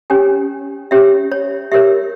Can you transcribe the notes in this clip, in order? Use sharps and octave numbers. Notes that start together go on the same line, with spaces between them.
C#4 G4 C#5 G#5
C#4 G4 C#5 E5
C#5
G4 A#4 C#5 E5